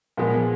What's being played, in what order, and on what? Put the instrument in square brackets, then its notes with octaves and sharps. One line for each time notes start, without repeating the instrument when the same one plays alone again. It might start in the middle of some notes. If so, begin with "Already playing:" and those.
[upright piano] A#2 F3 G#3 B3